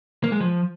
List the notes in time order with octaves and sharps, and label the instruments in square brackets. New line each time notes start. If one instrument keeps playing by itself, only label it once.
[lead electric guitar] A#3
G#3
F3